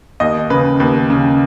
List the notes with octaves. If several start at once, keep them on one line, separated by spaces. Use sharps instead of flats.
D#2 D#5
C#3 B4
D#2 B4
C#3